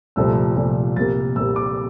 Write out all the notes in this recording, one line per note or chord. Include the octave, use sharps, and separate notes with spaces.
C2 A#2 F3 A3 E6
C2 A#2 F3 A3
C2 C3 G3 A#3 A6
C2 C3 G3 A#3 E6
D6